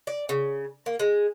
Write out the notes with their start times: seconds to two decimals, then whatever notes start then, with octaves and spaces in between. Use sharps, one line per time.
0.07 D5
0.29 C#3
0.86 A#3
0.99 G#3